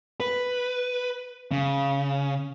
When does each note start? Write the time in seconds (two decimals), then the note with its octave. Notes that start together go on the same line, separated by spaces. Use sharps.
0.20 B4
1.52 C#3